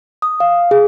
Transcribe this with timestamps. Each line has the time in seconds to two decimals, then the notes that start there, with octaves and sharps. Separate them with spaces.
0.22 D#6
0.40 F5
0.71 G#4